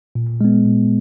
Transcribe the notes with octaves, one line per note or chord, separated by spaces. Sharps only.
A#2
G#3 B3
A#2